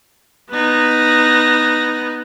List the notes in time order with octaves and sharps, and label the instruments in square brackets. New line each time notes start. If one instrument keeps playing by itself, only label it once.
[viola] B3 D#4